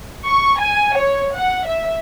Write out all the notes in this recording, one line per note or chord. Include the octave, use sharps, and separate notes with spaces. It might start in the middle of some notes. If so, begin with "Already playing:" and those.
C#6
G#5
C#5
F#5
E5